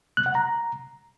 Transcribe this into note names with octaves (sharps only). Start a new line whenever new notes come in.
F#6
F#5
A#5